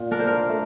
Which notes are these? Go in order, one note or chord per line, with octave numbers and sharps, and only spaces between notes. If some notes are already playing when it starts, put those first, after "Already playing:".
Already playing: A#2
D4 A#4
C5
A#4
A3